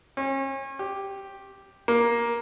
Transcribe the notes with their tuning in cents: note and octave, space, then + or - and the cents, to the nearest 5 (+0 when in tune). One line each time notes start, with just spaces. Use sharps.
C#4 -35
G4 +0
A#3 +10